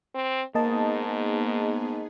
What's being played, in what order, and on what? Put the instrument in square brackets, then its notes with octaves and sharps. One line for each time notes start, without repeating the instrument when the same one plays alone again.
[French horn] C4
[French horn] G#2 [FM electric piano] A#3 D#5 A5 [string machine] B3 D#4 G#4